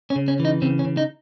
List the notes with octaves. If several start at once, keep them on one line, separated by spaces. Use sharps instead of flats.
C#4
C#3
C#4
E3
D#4
C#3 C4
C#4
C#3
D#4